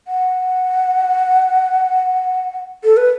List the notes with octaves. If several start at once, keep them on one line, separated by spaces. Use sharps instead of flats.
F#5
A4
B4